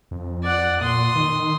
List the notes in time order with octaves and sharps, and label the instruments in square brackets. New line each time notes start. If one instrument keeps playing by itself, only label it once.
[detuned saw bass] F2
[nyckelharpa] D5 F#5
[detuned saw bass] A#2 [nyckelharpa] C6 D#6
[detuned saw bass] D#3